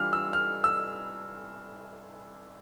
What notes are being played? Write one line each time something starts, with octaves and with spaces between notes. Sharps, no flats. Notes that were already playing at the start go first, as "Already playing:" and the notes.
Already playing: E3 G3 D4 F4 F6
E6
F6
E6